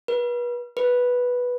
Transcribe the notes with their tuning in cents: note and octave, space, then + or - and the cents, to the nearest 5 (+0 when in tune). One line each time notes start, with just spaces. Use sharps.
B4 -35
B4 -5